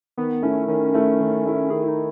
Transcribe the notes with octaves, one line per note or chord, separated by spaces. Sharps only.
D#3 B3
A3 C#4 E4
D#3 C#4
A3 E4
D#3
A3 E4
D#3 G#4
E4
D#4